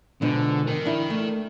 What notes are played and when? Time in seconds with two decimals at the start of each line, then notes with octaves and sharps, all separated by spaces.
0.22 G#2 B2 D3 F3
0.67 A#4 G5
0.85 D4 E4
1.10 A3